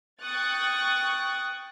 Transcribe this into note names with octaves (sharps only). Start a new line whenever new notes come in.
G5 C#6 D#6 F#6 A6